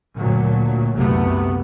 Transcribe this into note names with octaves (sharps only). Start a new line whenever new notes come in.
D2 A#2 F#3
F#1 C2 C3 A3 B3